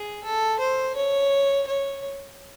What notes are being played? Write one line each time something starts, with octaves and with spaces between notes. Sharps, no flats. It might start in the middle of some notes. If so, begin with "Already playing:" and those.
Already playing: G#4
A4
C5
C#5
C#5